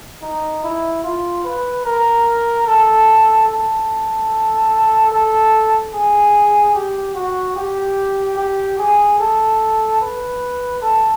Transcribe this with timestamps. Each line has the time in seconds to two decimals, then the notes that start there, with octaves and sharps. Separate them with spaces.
0.22 D#4
0.63 E4
1.04 F4
1.44 B4
1.85 A#4
2.67 A4
3.49 A4
5.12 A4
5.93 G#4
6.75 G4
7.15 F#4
7.56 G4
8.37 G4
8.79 G#4
9.19 A4
10.01 B4
10.82 A4